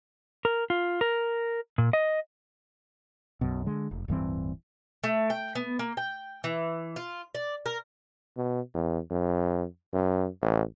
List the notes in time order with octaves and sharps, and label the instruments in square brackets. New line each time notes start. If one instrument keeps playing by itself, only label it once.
[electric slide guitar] A#4
F4
A#4
A#2
D#5
[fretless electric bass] B1 F#2 B2
D3 G#3
F1
D1 G2 E3 C4
[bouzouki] A3
G5
B3
A#3
G5
E3
F4
D5
A#4
[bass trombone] B2
E2
F2
F#2
A1